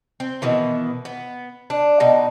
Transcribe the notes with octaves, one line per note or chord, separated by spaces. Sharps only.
C4
B2 D#3 E3
B3
D4
B2 D#4